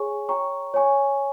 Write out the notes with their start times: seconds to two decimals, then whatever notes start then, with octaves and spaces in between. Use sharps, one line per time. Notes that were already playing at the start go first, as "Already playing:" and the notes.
Already playing: G#4 C#5 G#5 C#6
0.28 C#5 G5 A#5 C#6
0.74 C#5 G#5 C#6